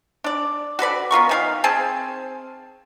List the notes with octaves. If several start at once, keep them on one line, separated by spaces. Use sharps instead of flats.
D4 D5
F#4 A4 B4 D5
B3 F4 A#4 C#6
D#3 G#4 F5
C4 G#4 A5